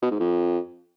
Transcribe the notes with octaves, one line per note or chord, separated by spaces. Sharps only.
B2
G#2
F2